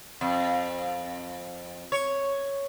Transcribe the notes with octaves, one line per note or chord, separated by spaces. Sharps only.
F2
C#5